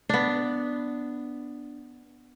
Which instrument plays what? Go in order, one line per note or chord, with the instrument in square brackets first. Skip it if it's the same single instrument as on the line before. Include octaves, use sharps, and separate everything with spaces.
[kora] B3 D4